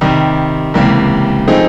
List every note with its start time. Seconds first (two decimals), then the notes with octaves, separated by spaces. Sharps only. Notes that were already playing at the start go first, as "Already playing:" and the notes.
0.01 C3 D#3 G3
0.74 C#2 C3 E3 G3 A#3
1.48 F3 A3 C4 D#4 G#4